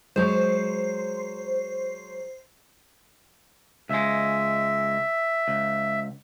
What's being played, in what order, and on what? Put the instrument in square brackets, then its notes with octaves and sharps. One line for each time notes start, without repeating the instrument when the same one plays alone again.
[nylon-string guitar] F#3 G#3 [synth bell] C5
[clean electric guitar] C#2 G#3 [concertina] E5
[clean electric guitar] C#2